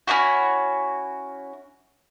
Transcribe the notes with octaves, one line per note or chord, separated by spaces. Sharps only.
C#4 D4 E4 F#4